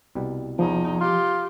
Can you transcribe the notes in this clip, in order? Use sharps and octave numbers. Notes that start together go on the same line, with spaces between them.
C2 B2 G3
E2 F3 D#4
F4 G4